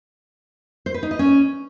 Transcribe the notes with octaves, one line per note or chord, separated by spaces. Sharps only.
C5
B4
D#4
D#5
C#4